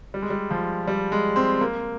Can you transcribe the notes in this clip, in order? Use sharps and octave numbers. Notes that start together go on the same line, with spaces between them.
G3
G#3
G3
F3
G3
G#3
C4
A#3